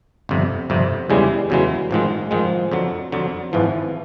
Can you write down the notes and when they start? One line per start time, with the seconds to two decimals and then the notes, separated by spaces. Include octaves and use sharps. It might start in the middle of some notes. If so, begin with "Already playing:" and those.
0.29 G1 F2 C3
0.70 G1 F2 C3
1.09 E2 C#3 E3 G3 G#3
1.50 E2 C#3 E3 F#3 G#3
1.91 A1 G#2 D#3 F3 G#3
2.31 A1 G#2 D#3 F3 G#3
2.72 F2 D3 F#3
3.12 F2 D3 F#3
3.52 G#1 G#2 E3 F3